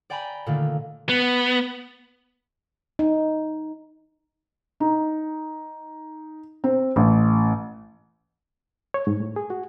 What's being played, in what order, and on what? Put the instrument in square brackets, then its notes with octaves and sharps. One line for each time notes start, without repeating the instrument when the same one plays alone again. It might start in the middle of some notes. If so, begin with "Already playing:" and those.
[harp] D5 G5 G#5 A#5 B5
A#2 D3 D#3 A3 A#3
[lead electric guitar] B3
[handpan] D#4
[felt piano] D#4
C4
A1
[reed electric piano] C#5
G#2
A2
G#4
F#4